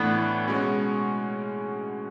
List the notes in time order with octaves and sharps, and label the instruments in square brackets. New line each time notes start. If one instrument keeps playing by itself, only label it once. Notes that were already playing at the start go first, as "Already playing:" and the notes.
Already playing: [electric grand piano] A2 E3 A3 D4 [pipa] B3
[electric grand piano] B2 G#3 C#4 F#4